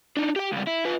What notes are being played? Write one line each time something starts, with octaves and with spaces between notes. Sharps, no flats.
D4 D#4
G4 G5
C#2 G3
E4
F4 B4